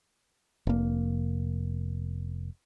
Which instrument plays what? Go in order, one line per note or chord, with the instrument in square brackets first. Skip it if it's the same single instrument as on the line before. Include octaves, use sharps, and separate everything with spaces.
[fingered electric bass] F1 A#3